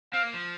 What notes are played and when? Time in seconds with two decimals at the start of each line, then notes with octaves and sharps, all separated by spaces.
0.13 C4 F5
0.23 A#3
0.34 F3